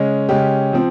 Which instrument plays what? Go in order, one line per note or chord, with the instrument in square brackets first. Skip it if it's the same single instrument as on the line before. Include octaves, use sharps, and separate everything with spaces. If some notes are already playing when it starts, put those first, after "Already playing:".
Already playing: [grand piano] C#3 G#3 C#4
C#3 G#3 C#4 G4
F3 C4